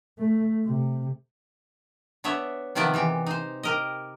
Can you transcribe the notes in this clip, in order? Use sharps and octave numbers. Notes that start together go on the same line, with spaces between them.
A3
C3
B3 D4 C#5 E5
C3 D#3 F3 B3 D5 A5
E3 G#3 G4
D#4 C5
G4 A#4 D#5